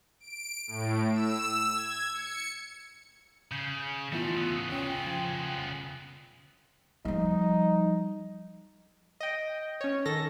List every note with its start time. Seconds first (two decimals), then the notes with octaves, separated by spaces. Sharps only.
0.20 D7
0.67 A2
1.12 E6
1.74 G#6
2.13 C#7
3.52 C#3 G6
4.12 E3 G3 A3 B3 E4 F4
4.37 C#3 B3 E6
4.72 C#4 G5
5.06 F3 C6 G#6
7.05 F3 G3 D#4
9.21 D#5 G5
9.81 C#4 C#5
10.06 D#3 A4 A#6